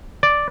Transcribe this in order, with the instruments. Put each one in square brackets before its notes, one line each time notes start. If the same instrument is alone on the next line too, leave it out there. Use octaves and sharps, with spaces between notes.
[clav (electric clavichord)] D5